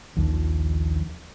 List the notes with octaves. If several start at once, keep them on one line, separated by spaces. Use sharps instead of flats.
A#1 D#2 F3